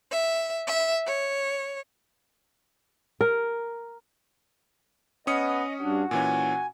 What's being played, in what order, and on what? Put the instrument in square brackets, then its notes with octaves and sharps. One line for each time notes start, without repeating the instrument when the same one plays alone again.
[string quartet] E5
E5
C#5
[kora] A#4
[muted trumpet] B3 [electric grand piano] C#4 D#6 C#7 [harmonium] D#5
[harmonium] G2 D4 [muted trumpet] F#4
[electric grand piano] A#2 E3 C#4 [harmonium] G#5